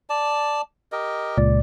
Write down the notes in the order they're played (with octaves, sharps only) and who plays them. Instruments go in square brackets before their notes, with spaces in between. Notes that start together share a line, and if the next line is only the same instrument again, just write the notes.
[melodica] D5 A5
G4 A#4 D#5
[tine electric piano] C#2 A#2 D5